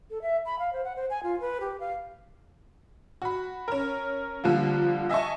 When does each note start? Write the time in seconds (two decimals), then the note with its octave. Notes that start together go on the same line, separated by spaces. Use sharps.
0.10 A4
0.22 E5
0.46 B5
0.59 F5
0.73 C5
0.84 F#5
0.96 C5
1.10 G#5
1.23 F4
1.40 B4
1.61 G4
1.80 F5
3.22 F#4 B5
3.68 C#4 A#4
4.44 D3 F3 G3 A#3
5.09 D#5 E5 G#5 A5 C#6